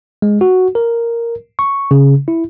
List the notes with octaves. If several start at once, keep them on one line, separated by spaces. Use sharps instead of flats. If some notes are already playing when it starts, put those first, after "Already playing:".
G#3
F#4
A#4
C#6
C#3
E4